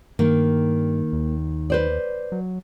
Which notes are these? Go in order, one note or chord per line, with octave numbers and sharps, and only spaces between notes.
G2 D#3 A#3
D#2
B4 C5 D5
F#3